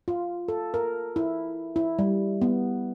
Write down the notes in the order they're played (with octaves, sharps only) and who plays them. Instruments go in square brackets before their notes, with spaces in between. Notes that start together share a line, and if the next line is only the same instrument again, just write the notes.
[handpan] F4
A4
A#4
E4
E4
G3
B3